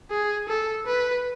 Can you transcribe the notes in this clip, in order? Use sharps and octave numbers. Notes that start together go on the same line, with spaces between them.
G#4
A4
B4